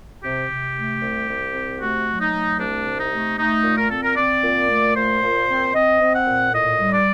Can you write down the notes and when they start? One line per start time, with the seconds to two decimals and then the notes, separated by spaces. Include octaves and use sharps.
0.23 C3 G4
0.49 C3
0.76 A3
1.01 C2
1.28 C2
1.54 C3
1.80 A3 F#4
2.07 F#3
2.20 D#4
2.33 A3
2.59 C2 D4
2.85 C3
2.98 D#4
3.12 A3
3.38 A3 D#4
3.64 A#2
3.77 A#4
3.90 C4 A4
4.02 A#4
4.16 C4 D5
4.43 A#2
4.69 A3
4.96 A#2 C5
5.22 A#2
5.48 C4
5.74 C4 D#5
6.01 C4
6.14 F#5
6.27 A#2
6.52 A2 D#5
6.79 G3
6.92 D5